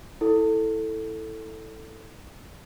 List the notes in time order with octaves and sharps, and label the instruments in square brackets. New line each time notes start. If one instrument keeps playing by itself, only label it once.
[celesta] E4 A4